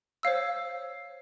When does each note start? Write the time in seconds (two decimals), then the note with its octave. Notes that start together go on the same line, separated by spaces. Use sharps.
0.23 C5 C#5 F5 E6